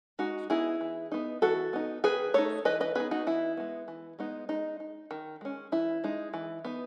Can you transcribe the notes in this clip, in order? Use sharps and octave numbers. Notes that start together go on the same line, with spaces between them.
G#3 D#4 F#4
B3 D#4 E4 G#4
E3
B3 D#4
E3 F#4 A4
B3 D#4
D#3 G#4 B4
A3 D#4 A4 C#5
E3 B4 D#5
B4 D#5
B3 D#4 G#4 B4
D#4 F#4
E3 E4
G#3 B3
E3
G#3 B3 D#4
G#3 D#4
D#4
D#3
G#3 C#4
E3 E4
G#3 D#4
E3
B3 D#4